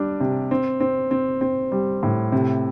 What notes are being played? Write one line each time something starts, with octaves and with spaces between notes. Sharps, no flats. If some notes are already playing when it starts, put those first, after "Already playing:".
Already playing: G3 D4
C3
C4
C4
C4
C4
G3
A2
C3